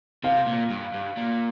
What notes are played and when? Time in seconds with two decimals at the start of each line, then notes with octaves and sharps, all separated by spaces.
0.24 C3 F5
0.46 A#2
0.70 G2
0.94 G2
1.17 A#2